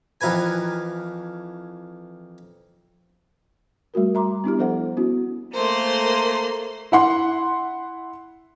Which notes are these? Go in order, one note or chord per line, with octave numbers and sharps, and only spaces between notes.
F2 E3 A#4 B4 G#5
G3 A3 F#4 A#4
E5 A#5 C6 D6
B3 D4 E4 G4
F3 D4 A4 C5 E5 F#5
B3 C#4 E4 F#4
A3 A#3 C5 C6
E4 F#5 C6